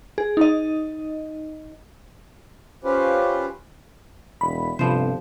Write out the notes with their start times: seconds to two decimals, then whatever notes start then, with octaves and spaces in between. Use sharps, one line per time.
0.18 G#4
0.37 D#4 D#5
2.84 C#4 F4 G4 B4 C5
4.41 E1 B5
4.79 G1 C3 F3 C5